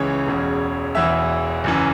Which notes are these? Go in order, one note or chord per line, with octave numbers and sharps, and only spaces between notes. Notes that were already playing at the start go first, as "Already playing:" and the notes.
Already playing: C#2 C#3 E3 C#5 C#6
E1 E2 C#3
E1 E2 E3 E5 E6
F#1 F#2 E3